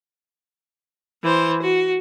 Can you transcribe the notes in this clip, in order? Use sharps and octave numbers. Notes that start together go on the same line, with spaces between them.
E3 C5
F#4